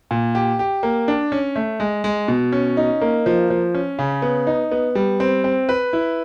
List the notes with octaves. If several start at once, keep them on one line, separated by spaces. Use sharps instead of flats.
A#2
G4
G4
A#3
D4
C#4
A3
G#3
G#3
B2
C#4
D#4
A#3
F3
F3
C#4
C#3
B3
D#4
B3
G3
C4
C4
B4
E4